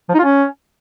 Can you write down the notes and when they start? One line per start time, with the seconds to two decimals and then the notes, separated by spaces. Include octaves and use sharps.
0.09 F3
0.14 D#4
0.19 F4
0.24 C#4